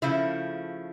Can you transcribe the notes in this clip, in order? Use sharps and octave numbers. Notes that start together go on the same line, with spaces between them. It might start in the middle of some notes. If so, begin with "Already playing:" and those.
C#3 F3 A3 E4